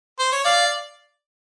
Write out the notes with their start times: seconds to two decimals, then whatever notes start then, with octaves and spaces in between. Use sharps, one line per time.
0.19 C5
0.32 C#5
0.45 D5 F5